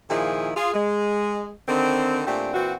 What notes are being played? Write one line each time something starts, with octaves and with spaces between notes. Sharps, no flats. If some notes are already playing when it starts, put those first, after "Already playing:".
A#2 D#3 F3 E4 G#4
F4 G#4
G#3
D3 D#3 C4
A#2 A3 C4 D4 G4
A#2 E3 C4 F#4